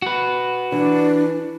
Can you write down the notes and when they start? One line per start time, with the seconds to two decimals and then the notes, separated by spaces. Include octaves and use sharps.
0.02 F#4 B4
0.72 E3 D4